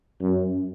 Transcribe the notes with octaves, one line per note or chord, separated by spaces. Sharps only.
F#2